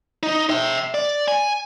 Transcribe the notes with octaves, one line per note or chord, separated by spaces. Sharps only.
D#4
E5 G5
D5
G#5